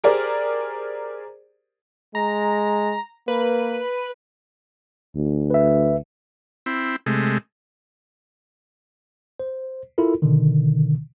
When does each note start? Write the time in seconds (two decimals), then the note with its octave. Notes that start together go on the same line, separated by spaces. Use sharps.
0.04 G4 G#4 A#4 C5 D5
2.15 G#3 A#5
3.28 A#3 B4
5.16 D2
5.50 B4 E5
6.66 C4 E4
7.06 C3 G#3 A3
9.39 C5
9.98 E4 F4 A4 A#4
10.22 B2 D3 D#3